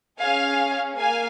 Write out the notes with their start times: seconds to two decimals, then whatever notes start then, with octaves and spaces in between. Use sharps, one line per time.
0.20 C#4 G#4 F5 G#5
0.98 A#3 F5 G#5